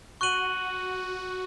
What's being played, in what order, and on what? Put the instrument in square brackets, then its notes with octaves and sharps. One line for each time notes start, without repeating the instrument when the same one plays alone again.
[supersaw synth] F#4 [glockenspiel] C#6 F#6 D#7 F#7